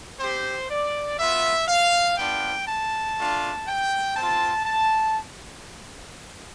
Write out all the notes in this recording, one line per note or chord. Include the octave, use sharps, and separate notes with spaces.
C4 G4 C5
D5
B3 F4 E5
F5
B3 D4 F4 G5
A5
A3 D4 F4
G5
C4 F4 A5
A5